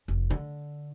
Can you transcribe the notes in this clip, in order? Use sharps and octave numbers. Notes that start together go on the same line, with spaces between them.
F1
D3